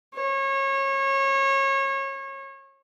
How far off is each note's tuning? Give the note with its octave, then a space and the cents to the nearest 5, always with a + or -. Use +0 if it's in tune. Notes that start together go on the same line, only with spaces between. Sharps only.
C#5 -30